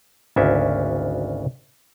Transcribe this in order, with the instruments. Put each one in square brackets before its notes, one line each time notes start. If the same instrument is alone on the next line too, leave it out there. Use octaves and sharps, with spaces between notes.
[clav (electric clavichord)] G#1 D2 C#3 C#4 D4 E5